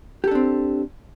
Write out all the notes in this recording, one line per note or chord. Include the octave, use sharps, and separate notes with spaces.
C4 D4 G4 A4